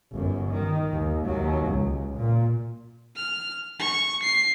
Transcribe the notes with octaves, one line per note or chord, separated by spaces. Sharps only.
G1 F#2
D#3
D#2
D#2 F#3
C#2
A#2
F6
C#6
C7